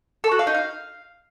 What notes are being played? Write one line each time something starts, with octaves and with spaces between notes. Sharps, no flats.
A4
F#4
F5
D#4
F5